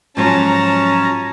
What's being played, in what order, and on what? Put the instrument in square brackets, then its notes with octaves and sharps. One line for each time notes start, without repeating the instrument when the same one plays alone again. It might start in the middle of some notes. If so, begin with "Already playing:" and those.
[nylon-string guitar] G#2 F3 F#3 [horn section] C#4 [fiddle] A5 A#5